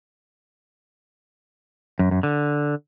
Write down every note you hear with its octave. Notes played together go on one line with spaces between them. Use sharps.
F#2
F#2
D3